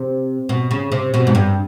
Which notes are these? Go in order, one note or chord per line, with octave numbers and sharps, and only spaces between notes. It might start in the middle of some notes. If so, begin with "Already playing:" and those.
Already playing: C3
B2
C#3
C3
B2
G#2
G2